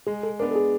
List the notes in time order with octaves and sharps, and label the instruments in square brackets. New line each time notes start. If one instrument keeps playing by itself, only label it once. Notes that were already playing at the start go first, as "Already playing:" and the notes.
[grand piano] G#3 [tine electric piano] G#4
[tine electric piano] A4
[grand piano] B3 D4 [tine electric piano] A#4
[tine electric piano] A4
G#4